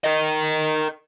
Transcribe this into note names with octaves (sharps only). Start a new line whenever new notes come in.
A#4 D#5